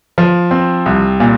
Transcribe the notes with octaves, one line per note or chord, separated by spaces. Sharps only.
F3
C4
C2
A#2